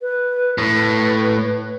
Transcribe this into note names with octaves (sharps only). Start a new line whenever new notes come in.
B4
A2 B4